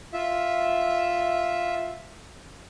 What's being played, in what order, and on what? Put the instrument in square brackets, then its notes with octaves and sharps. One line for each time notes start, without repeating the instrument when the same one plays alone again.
[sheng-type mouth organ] F4 E5